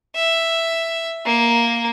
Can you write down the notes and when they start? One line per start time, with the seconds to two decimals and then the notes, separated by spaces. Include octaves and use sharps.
0.15 E5
1.26 A#3